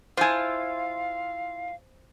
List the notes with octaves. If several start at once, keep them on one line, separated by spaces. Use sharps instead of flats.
E4 F4 C5 F5 G#5